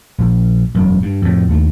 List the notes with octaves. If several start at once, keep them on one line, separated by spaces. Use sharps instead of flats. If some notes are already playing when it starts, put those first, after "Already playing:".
A#1
E1 F#2
G2
F2 A2
D#2 A3